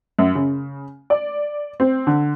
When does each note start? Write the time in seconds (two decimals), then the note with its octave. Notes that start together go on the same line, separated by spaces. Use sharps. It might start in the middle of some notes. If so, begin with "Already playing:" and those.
0.19 F#2
0.35 C#3
1.10 D5
1.80 C4
2.07 D3